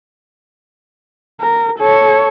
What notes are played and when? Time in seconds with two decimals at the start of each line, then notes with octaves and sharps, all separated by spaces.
1.41 A#4
1.78 A4 C#5